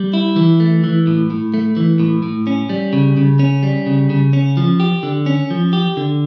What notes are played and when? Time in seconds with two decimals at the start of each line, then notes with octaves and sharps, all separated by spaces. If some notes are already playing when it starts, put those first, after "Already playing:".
Already playing: G3
0.13 E4
0.36 E3
0.60 A3
0.84 E3
1.07 A2
1.30 A2
1.54 A3
1.77 E3
2.00 A2
2.23 A2
2.47 C#4
2.69 G3
2.93 C#3
3.17 C#3
3.39 C#4
3.63 G3
3.86 C#3
4.10 C#3
4.33 C#4
4.57 F3
4.80 G4
5.03 D3
5.26 C#4
5.50 F3
5.73 G4
5.97 D3